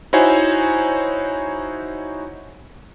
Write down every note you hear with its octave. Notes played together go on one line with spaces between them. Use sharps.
D#4 E4 F#4 C5 C#5 G#5